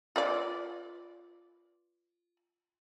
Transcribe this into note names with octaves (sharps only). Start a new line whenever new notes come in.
F4 B4 D5